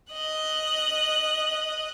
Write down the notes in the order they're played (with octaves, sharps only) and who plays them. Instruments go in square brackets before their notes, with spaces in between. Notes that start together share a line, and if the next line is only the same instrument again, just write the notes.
[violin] D#5 F#6